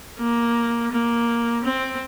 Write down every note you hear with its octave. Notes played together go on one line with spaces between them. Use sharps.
A#3
A#3
C4